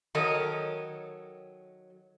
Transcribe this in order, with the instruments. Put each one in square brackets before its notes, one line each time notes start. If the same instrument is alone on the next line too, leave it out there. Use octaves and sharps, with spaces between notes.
[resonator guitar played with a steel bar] D#3 F#3 A4 A#4 C#5 D#5